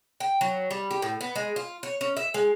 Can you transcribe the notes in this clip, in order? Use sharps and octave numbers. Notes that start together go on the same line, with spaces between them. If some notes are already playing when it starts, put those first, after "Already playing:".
G5
F#3
G3
G4
A2
B3
G#3
F4
C#5
C#4
E5
G#3